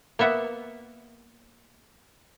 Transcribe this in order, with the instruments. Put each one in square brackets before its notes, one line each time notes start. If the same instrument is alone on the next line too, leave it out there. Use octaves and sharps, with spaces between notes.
[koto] A#3 B3 E5 F#5